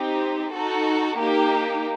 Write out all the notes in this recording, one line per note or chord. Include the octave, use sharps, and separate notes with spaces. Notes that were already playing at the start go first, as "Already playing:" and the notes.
Already playing: C4 D#4 G4
D#4 F#4 A4
A#3 D#4 G4